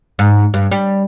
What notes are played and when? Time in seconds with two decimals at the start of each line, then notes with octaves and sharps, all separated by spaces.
0.19 G#2
0.54 G2
0.71 G3